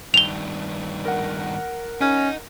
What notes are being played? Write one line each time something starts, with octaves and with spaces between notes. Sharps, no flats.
G2 D#3 F7 G7
A#4 F#5
C#4 D#4